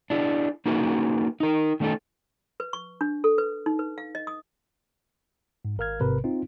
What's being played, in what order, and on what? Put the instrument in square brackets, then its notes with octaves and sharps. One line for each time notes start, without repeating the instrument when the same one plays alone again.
[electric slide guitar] D4 E4 G#4
A#3 C#4 D#4 F#4 G#4 B4
D#4 A#4
D#3 A3 C#4 D#4 A4
[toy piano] B4
C#6
D4
A4
B4
D#4
B4
F5
D#5
D#6
[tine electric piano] G#2
G#1 A#4 F5 F6 G#6
A1 G#2 C3 A#4 B4
C4 D#4 F4